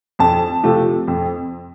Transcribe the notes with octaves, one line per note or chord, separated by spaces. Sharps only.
F2 A5
C3 F3 A3
F2